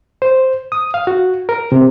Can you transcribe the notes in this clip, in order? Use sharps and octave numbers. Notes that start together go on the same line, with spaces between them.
C5
D#6
F5
F#4
A#4
C3